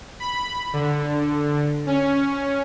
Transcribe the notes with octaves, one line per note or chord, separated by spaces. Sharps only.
B5
D3
C#4